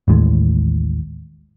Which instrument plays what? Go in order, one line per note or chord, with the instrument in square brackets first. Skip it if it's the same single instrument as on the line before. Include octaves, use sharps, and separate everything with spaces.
[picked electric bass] A1 D#2 A2 G#3